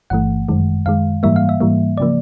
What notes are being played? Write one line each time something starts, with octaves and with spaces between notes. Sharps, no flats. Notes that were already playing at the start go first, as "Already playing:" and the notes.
G1 G2 E3 A3 F#5
F#2 D#3 G#3
F#2 D#3 G#3 F5
G#2 E3 G3 A#3 E5
F5
E5
G#2 E3 G3 A#3
C#3 F3 A#3 D5